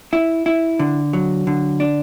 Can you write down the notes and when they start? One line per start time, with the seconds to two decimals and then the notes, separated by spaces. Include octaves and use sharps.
0.13 E4
0.46 E4
0.79 D3
1.13 F#3
1.47 D3
1.80 D4